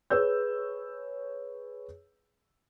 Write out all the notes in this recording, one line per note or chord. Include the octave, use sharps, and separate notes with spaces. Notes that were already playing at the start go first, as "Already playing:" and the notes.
G#4 B4 C#5 E6 G6